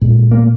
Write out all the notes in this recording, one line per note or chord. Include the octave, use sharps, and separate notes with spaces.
A#2 G#3
A#3